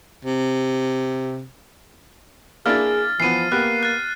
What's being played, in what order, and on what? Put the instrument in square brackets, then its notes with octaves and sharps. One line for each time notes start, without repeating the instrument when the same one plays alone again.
[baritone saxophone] C3
[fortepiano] A#3 D4 E4 [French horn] G#4 [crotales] F6 A6
[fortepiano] E3 B3 [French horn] F3 [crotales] C7 D#7
[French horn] A#3 [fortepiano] B3 G4 [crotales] F#6
[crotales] F#6 A6